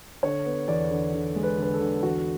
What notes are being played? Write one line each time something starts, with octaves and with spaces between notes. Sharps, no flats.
D3 C#5
B3
E2 D5
D3
D3
G#3
B4
D3 B4
A4
D3
E2 F#4